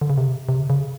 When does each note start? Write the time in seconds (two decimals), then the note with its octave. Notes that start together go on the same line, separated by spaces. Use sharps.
0.01 D3
0.10 C#3
0.18 C3
0.49 C3
0.59 C#3
0.70 C#3